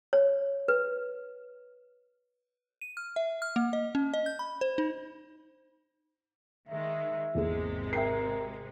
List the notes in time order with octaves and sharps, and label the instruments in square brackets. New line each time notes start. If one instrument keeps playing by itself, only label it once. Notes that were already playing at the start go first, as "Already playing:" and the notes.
[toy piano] C#5
B4
[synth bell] D#7
F6
E5
F6
A#3
D#5
C#4
D#5
G6
B5
C5
D#4
[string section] D#3 G#3 [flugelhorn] E5
[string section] G#1 C3 G#3 [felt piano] E2 A#3 G#4
[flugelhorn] A#4 [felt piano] E5 G5 C7